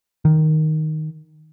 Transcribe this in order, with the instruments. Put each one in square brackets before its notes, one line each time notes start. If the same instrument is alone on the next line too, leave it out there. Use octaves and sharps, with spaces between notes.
[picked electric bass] D#3